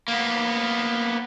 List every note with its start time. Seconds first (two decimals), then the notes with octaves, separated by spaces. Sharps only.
0.08 A#3 B3